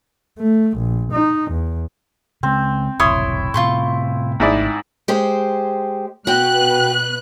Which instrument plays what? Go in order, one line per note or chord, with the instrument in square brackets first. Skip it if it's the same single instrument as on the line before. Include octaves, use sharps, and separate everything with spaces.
[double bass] A3
A#1
D#4
E2
[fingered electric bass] C#3 G#3 [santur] C4
[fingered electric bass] F1 B1 [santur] E4 [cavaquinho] C#5 C6 D#6
[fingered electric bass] A2 C3 [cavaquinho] F4 C6 C#6
[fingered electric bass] G#1 A3 D4 [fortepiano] G#2 E4 D5
[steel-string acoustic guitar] G#3 G4 C5
[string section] B2 B4 F#6 [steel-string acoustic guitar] F#4 G5